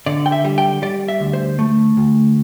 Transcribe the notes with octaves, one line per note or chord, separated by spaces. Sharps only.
D3 D5
G5
E5
G3
G5
G3 D5
E5
D2
C5
A3
D2